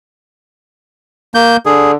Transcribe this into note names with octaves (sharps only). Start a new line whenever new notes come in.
A#3 G6
D3 G#4